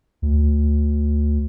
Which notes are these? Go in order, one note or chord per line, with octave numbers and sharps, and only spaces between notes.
D2